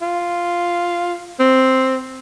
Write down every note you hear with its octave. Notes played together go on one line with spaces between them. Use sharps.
F4
C4